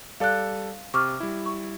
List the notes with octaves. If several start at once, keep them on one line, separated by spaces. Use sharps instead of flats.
G3 A4 D5 F5 F#6
C3 C#6 D6 F6
G3 E4
C#6